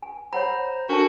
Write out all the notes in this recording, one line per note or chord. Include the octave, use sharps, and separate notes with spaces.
G#5
C5 C#5 F#5 A#5 B5
D4 F#4 A4 A#4 A5